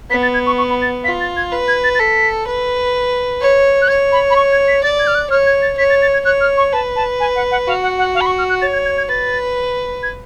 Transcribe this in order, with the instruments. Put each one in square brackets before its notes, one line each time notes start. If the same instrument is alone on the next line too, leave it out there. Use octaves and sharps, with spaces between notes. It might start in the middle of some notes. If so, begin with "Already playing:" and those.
[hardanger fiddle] B3 [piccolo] B6
[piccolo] A6
G#6
C#6
C#6
B5
A6
[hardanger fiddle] F4 [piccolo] B6
[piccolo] A6
G#6
[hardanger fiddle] B4
[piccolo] G#6
A6
A6
[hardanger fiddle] A4 [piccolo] B6
[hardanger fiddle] B4
C#5
[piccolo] F#6
[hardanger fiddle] C#5 [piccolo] G#6
[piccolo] B5
B5
C#6
G#6
B6
[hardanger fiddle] D5 [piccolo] A6
[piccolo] G#6
F6
F#6
[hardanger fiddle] C#5 [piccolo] F6
[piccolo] G#6
A6
[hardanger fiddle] C#5 [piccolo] B6
[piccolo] A6
A6
G#6
[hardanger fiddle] C#5 [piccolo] F#6
[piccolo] F6
C#6
[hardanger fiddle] B4 [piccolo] A5
[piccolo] A5
G#5
F#5
F#5
[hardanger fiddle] F#4 [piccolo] F5
[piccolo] F#5
F#5
F5
B5
C#6
F6
F#6
[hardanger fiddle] C#5 [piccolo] A6
[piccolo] G#6
G#6
G#6
[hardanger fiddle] B4 [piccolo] A6
[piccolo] G#6